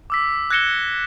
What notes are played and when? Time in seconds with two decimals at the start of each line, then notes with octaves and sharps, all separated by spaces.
0.10 D6 E6 B6
0.51 F#6 G#6 A#6 C#7 E7 G7